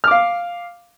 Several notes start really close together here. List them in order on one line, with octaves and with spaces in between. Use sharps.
F6 D6 F5